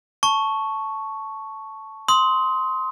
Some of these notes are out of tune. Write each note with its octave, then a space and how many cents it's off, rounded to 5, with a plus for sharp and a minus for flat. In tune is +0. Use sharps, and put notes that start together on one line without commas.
A5 +0 C#6 +0
C6 +0 D#6 +30